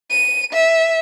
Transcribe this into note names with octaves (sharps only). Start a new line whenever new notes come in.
D#7
E5